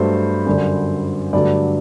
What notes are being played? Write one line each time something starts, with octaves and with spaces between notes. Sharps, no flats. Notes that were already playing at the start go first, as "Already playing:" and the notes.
Already playing: G2 F#3 A3 C5
F#2 D3 G3 D4
G2 D3 F#3 A3 D5